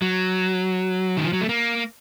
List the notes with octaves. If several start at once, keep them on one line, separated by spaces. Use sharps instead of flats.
F#3
D#3
F3
F#3
A3
A#3